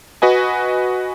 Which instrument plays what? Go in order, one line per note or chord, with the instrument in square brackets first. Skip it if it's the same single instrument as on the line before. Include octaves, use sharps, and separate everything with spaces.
[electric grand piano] F#4 B4 D#5 G#5